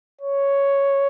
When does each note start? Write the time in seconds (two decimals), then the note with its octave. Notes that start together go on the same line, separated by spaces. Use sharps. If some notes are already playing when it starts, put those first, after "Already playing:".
0.21 C#5